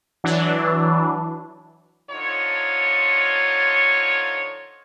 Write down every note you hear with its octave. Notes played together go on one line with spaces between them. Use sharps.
E3 F#3 D4
D3 F3 D#4 F4 C#5